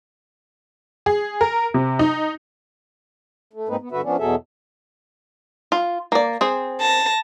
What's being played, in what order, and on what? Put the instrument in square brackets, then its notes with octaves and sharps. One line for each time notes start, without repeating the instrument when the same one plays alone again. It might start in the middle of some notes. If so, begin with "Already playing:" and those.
[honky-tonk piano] G#4
A#4
C3
D#4
[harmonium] A3
G#2 G#3 A#3 C4 D#4 B4
B3
G2 D3 F#4 B4 E5
F3 B3 C#4 D4
E2 B2 F#3 G#4 A4 E5
[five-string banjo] F4
A#3 D5
C4 G#4
[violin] A5 A#6